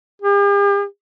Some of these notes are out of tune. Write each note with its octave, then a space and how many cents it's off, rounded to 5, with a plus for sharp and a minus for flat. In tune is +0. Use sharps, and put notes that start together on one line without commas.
G4 +45